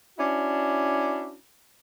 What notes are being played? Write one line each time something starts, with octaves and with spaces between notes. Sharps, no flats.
C#4 D4 E4 F#4